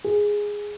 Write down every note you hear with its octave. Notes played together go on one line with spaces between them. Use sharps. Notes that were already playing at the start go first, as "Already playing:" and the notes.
G#4